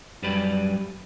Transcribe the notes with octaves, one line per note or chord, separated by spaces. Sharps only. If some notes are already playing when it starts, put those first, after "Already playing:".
F#2 G3 G4 B4 D5 B5